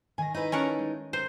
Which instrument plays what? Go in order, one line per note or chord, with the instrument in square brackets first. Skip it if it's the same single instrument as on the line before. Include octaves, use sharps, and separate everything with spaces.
[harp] D#3 A#6 [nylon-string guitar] G#5
[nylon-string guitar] D#4 E4 B4
[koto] C#4 A#4 F#5 [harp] A5
[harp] G#3
[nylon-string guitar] A#4 [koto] C5